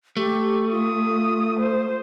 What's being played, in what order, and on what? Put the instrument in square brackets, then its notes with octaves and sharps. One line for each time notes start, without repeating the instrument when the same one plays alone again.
[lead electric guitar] A3 [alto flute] G4
[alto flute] F4 [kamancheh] D#6
[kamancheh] C5